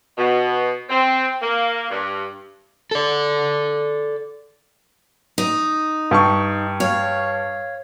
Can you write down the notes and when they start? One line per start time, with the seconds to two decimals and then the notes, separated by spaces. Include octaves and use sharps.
0.18 B2
0.90 C4
1.42 A#3
1.90 G2
2.91 A4 D5
5.38 D#4
6.11 G2 A5 C#6
6.80 C#5 F5